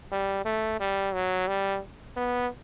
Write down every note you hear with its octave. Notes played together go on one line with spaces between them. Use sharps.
G3
A3
G3
F#3
G3
B3